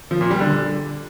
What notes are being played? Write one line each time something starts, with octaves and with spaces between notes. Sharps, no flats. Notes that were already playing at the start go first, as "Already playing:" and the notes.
F3
A#2
G3
D3